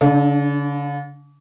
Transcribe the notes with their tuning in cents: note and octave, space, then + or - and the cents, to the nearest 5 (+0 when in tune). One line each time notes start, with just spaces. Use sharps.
D3 -45 D4 +10